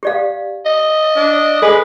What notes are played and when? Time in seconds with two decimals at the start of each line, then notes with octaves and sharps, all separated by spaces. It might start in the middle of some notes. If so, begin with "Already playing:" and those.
0.03 G4 D5 F5
0.65 D#5
1.16 D4
1.62 G#3 A4 B4 G#5